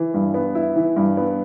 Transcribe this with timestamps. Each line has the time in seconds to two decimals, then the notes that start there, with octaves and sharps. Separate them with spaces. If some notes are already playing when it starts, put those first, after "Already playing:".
Already playing: E3
0.14 G2
0.34 B3
0.55 E4
0.76 E3
0.96 G2
1.17 B3